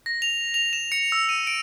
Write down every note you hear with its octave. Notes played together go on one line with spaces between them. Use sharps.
A#6
F7
F7
E7
C#7
E6
D#7
D7